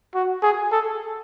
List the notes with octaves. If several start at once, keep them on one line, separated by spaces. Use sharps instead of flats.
F#4
G#4
A4